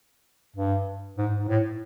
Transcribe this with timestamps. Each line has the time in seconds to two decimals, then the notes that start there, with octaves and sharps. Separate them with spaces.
0.56 G2
1.18 G#2
1.39 G#2
1.48 A2